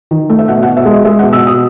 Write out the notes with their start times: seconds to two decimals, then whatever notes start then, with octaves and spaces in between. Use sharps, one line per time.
0.11 D#3
0.30 A3
0.39 E5
0.48 B2 F#5
0.63 F#5
0.67 B2
0.77 E5
0.86 G#3
0.91 D#5
1.05 G#3 E5
1.19 F#5
1.23 B2
1.33 E6
1.42 B2 D#6